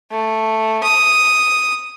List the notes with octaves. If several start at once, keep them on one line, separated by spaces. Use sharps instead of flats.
A3
D#6